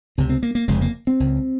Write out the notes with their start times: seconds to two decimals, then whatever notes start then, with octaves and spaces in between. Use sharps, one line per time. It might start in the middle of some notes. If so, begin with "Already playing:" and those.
0.18 C#2 C3 C4
0.29 C4
0.43 A#3
0.55 A#3
0.68 F1 F2 C#3 G#3
0.81 A#3
1.07 C4
1.20 C#2 C#3